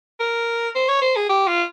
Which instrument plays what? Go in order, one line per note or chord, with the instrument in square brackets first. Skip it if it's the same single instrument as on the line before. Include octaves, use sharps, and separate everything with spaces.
[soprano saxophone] A#4
C5
C#5
C5
G#4
G4
F4